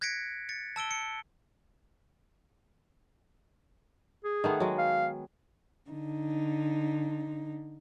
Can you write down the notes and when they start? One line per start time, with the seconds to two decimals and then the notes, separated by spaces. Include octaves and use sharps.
0.01 F#6 G#6 A#6 B6 C#7 D7
0.49 A6 C#7
0.76 A5 E6 D7 G7
0.91 C#7
4.24 G#4
4.44 D#3 A3 B3
4.60 F#3 G#3
4.78 F5
5.89 D3 D#4